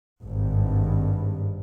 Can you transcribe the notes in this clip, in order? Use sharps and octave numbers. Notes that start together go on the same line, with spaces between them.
G#1 G2